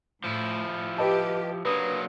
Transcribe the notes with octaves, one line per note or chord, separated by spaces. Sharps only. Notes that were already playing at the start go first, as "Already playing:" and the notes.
A2 F3 E4
G4 B4 D#5 A5
F#3 A#3 D4 B4 D#6